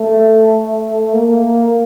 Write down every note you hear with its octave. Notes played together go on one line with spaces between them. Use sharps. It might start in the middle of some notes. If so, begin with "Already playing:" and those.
Already playing: A3
A#3